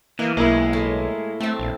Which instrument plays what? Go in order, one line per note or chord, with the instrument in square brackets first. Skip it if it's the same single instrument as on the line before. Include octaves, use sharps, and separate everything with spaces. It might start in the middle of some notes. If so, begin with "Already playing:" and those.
[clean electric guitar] E3 [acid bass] A#3 [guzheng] D#5
[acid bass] B1 [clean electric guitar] G#3 [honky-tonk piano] A#3 E4
[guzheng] A2
[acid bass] A3 [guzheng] C4 E5 A5
[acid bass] A#1